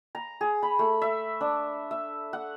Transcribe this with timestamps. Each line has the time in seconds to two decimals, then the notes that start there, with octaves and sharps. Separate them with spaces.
0.15 A#5
0.41 G#4
0.63 B5
0.79 A3
1.02 E5
1.41 D4
1.91 E5
2.33 F#5